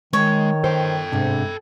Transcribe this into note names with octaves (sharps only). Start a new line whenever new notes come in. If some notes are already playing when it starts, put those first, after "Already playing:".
D#3 G#3 C#5
A4 C5 G5
G#2 C3 D4